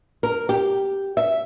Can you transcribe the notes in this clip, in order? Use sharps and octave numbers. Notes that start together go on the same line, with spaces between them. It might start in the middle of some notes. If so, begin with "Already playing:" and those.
A#4
G4
E5